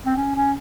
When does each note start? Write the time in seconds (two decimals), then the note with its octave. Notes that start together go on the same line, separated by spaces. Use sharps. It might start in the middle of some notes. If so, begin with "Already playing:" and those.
0.06 C4
0.16 C#4
0.35 C#4